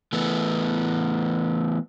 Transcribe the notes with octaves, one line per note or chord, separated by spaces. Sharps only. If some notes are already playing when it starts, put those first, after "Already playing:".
E3 A3 B3